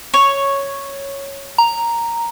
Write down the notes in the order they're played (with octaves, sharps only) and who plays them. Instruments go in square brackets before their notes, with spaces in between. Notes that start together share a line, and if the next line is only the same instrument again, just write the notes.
[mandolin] C#5
[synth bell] A#5